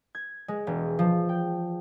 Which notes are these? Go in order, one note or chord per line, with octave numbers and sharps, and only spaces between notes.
G#6
G#3
E1
F3
G5